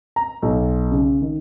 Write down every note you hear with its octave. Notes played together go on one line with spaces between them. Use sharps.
A#5
B1
C#3
D#3